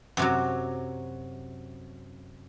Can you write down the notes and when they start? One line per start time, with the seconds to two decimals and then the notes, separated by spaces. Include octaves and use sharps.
0.17 F#2 C3 F#3